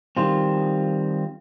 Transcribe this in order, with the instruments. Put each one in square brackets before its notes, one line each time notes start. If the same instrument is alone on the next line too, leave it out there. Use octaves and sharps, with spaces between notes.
[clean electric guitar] D#3 G3 C4 F4